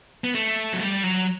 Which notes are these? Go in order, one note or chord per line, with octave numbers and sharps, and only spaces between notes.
B3
A3
F#3
G3
F#3